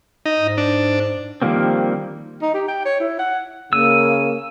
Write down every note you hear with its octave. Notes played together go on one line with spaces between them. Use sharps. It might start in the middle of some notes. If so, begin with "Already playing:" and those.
D#4
G#2
D4
D#3 F3 G3 A#3 C4
D#4
G4
G5
C#5
E4
F#5
C#3 A#3 E6 D#7